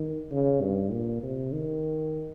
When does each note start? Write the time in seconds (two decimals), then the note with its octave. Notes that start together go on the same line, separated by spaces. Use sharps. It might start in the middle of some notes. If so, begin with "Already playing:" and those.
Already playing: D#3
0.31 C#3
0.61 G2
0.92 A#2
1.23 C3
1.52 D#3